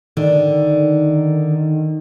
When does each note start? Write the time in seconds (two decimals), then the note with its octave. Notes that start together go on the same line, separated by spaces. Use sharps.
0.17 D3 D#3